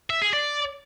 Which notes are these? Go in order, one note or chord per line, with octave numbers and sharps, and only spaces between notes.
E5
G#4
D5